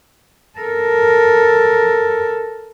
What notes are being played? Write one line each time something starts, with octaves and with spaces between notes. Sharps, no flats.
A4 A#4